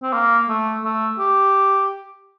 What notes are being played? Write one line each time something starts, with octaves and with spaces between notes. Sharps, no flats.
C4
A#3
A3
A3
G4